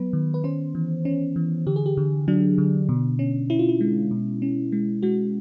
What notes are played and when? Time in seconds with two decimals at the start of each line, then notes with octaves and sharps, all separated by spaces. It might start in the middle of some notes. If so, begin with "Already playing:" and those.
Already playing: F#3 B3 B4
0.13 D#3
0.34 B4
0.44 C#4 C5
0.75 E3
1.05 C#4
1.36 E3
1.67 D3 G4
1.76 G#4
1.86 G4
1.97 D3
2.28 F#3 D4
2.58 D3
2.89 B2
3.19 C#4
3.50 C#4 E4
3.59 F4
3.69 E4
3.81 G#3
4.11 B2
4.42 C#4
4.72 G#3
5.03 G#3 F#4